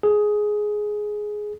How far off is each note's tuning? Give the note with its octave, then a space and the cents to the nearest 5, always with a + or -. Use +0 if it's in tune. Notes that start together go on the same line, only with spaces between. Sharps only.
G#4 +10